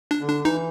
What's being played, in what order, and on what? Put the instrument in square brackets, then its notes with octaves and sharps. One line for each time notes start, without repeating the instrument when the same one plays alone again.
[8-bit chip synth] D4
[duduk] D3
[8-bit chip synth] D4
[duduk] E3 [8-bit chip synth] D#4